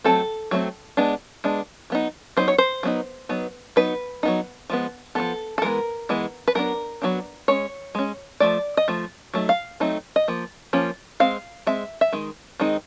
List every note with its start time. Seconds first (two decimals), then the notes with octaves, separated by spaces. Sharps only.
0.04 F#3 A3 C4 A4
0.51 F#3 A3 C4
0.97 G#3 B3 D4
1.44 G#3 B3 D4
1.90 F#3 B3 D#4
2.37 F#3 B3 D#4 C5
2.48 C#5
2.58 C5
2.83 F#3 B3 D#4
3.29 F#3 B3 D#4
3.76 F#3 B3 D#4 B4
4.23 F#3 B3 D#4
4.70 F3 G#3 B3
5.15 F3 G#3 B3 A4
5.58 A4
5.62 E3 G#3 B3 A#4
6.09 E3 G#3 B3
6.48 B4
6.55 F#3 B3 D4 A#4
7.02 F#3 B3 D4
7.48 G#3 C#4 C#5
7.95 G#3 C#4
8.40 F3 A3 D5
8.77 D#5
8.88 F3 A3
9.34 F#3 A3 D#4
9.49 F5
9.80 F#3 A3 C4 D#4
10.16 D#5
10.28 F3 A#3
10.73 F3 A#3 C#4
11.20 G#3 C4 F5
11.67 G#3 C4 E5
12.01 E5
12.13 D#3 G#3
12.59 D#3 G#3 C4 D#4